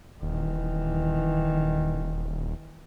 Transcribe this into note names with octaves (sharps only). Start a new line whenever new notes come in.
D#1 D#3 E3